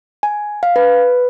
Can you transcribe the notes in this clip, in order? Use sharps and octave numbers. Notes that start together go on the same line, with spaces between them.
G#5
F5
B4